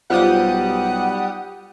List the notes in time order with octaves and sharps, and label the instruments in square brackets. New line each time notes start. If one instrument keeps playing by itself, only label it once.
[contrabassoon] B1 [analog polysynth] G3 G4 D#6 [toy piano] F4 C5 F5 [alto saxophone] F#5